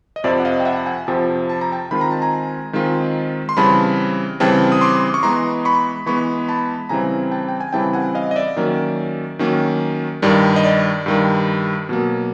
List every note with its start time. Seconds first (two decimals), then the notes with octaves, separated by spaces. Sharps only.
0.16 D#5
0.24 F2 C3 F3 D5 E5
0.40 F#5
0.45 D#5 F5
0.60 G5
0.65 E5 F#5
0.86 F#5 G#5
1.07 F2 C3 F3 G5 A5
1.49 A5
1.61 A#5
1.72 G5 A5
1.91 D#3 G#3 C4 F4 B5
2.01 A#5
2.11 A5
2.22 G#5 A#5
2.73 D#3 G#3 C4 F4
3.49 C6
3.57 C#3 E3 G3 C4 A5 B5
4.40 C#3 E3 G3 C4 G5 A5
4.72 D#6
4.81 C6 D6
5.14 C#6
5.23 E3 G#3 B3 A#5 C6
5.65 B5 C#6
6.06 E3 G#3 B3 B5 C#6
6.48 A5 B5
6.89 C#3 E3 G3 C4 E4 G#5 A#5
7.31 G5 A5
7.48 G5
7.61 G#5
7.73 C#3 E3 G3 C4 E4 G5 A5
7.93 F#5 G#5
8.15 D#5 F5
8.31 D#5
8.36 D5 E5
8.56 D#3 F#3 A#3 C#4
9.39 D#3 F#3 A#3 C#4
10.22 G2 D#3 G3 D5
10.56 D#5
10.64 D5
11.06 G2 D#3 G3
11.89 B2 F#3 A#3